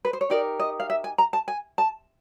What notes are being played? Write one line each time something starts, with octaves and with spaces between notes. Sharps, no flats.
B4
C5
C#5
D#4 G4 A#4 D5
D#5
F5
E5
G#5
A#5
A5
G#5
A5